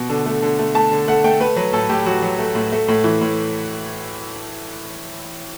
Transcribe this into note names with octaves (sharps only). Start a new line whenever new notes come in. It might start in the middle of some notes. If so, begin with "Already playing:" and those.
Already playing: B2
D3
A3
D3
A3
A3 A5
D3
A3 F#5
A3 G5
A3 B4
F#3 B4
A2 A4
A2 G4
F#3 F#4
F#3
A3
A2
A3
A2
E3
A2